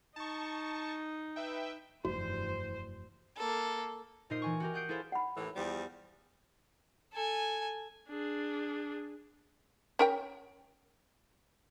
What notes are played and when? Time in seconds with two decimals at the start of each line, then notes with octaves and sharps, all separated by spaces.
0.16 D#4 A5 C#6
1.36 B4 E5 G5
2.05 F1 G2 E3 F#4 C5
3.37 A#3 A4
4.30 A#2 D#4 A#4 C5 D#5 C7
4.42 E3 G#5 C#6
4.60 F#4 G4 A#4
4.74 F#5 D#6 G6 C7 D7
4.89 E4 G#4 A4 B4 C5 F5
5.12 F#5 B5
5.36 D#2 A2 E3
5.55 E2 F3 G3
7.13 A4 G#5
8.09 D4 G#4
9.99 C#4 A#4 G5